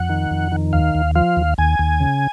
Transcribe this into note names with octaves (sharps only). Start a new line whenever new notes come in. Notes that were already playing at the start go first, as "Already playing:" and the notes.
Already playing: F2 F#5
D#3
F2
D#3
D#2 F5
D#2
F3 F5
D#2
D#2 G#5
D#2
C#3